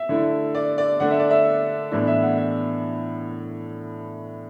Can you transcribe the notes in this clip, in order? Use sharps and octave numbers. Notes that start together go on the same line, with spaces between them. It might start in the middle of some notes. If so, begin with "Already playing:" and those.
Already playing: E5
D3 A3 E4
D5
D5
D3 A3 D4 F#5
E5
D5
E5
A2 E3 B3 D4
E5
F#5
E5